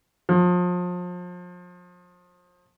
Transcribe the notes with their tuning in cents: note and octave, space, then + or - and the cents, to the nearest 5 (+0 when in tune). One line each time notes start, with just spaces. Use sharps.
F3 +35